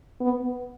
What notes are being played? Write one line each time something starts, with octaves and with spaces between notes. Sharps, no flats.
B3